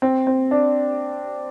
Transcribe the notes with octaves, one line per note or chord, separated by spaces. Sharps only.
C4
C4
D4